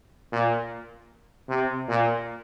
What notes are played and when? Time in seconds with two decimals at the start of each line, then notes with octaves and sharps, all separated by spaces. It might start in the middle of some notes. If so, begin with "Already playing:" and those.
0.33 A#2
1.49 C3
1.89 A#2